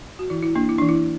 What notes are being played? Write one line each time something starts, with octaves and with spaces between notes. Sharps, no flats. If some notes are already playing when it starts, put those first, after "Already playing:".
F#4
E3 E4
E4
A#3 D4
E4
E3 D4
E4